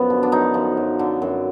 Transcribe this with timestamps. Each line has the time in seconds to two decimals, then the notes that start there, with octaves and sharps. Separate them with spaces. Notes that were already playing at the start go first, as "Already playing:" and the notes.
Already playing: F#2 F3 B3
0.10 D3
0.23 D4
0.32 F#2 D#4
0.54 F3
0.77 F#2
0.99 D3
1.22 F#2